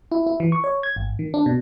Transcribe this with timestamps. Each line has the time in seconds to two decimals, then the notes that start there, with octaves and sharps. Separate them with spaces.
0.12 E4
0.26 E4
0.40 E3
0.52 C#6
0.64 C#5
0.83 G#6
0.96 G#1
1.19 D#3
1.34 D4
1.46 B2